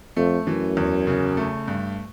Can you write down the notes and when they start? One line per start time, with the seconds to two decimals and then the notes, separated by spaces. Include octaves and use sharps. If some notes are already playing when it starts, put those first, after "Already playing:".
0.16 F2 A3
0.47 F#2 E3
0.77 E2
1.07 C#3
1.37 A3
1.68 G2